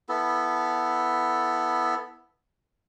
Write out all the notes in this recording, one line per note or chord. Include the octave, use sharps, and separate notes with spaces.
B3 E4 A4